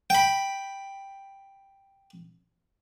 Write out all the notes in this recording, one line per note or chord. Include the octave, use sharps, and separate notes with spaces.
G5 B5